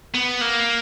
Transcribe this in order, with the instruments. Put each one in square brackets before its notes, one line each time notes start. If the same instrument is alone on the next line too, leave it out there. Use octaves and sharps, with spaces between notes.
[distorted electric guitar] B3
A#3